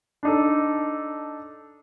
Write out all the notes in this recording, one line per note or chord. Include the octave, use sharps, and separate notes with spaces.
D4 D#4 A4